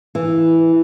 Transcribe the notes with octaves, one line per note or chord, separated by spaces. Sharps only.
E3